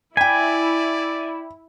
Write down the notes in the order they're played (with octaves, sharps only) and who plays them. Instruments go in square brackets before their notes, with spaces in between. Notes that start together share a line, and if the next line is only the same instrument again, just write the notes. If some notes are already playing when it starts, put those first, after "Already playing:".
[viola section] E4 [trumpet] D5 [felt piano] G5 B6 [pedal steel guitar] G#5